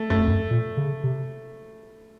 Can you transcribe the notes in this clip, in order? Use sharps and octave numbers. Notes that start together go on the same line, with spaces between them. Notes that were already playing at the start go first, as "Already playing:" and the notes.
Already playing: A3
F#2 A3
F2
F#2
A#2
C#3
C3